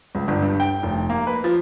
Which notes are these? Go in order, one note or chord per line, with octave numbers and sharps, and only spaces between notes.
C#2
G1
G2
G5
F1
A#3
B4
F3